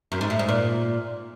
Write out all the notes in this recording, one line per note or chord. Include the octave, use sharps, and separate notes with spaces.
F#2
G#2
A2
G#2
A#2